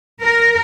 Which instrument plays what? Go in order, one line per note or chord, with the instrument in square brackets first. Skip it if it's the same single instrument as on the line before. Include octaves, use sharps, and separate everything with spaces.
[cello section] A#4